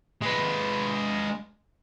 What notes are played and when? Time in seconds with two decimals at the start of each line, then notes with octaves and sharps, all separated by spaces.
0.22 G#3 B4